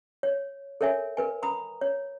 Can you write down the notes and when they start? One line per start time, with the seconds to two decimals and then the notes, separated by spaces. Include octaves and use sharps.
0.23 C#5
0.81 A4 A#4 C#5 E5 G#5
1.17 A#4 B4 G#5
1.43 A#5 B5 D#6
1.81 C#5